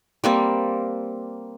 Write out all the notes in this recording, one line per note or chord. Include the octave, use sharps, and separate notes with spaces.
G3 A#3 C4